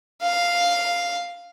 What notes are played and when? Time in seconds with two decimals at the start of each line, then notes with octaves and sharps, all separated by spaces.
0.22 F5